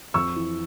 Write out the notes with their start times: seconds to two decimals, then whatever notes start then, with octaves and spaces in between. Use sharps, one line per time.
0.14 F2 C#6 E6
0.36 E3